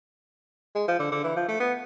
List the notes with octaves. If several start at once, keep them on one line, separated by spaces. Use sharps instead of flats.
G#3
F3
D3
D3
E3
F3
A3
B3